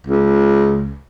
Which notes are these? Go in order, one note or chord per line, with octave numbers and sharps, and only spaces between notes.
C#2